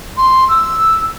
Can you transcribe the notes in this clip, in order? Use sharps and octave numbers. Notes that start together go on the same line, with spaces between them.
C6
E6